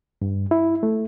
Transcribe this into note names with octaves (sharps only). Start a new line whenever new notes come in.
G2
E4
A3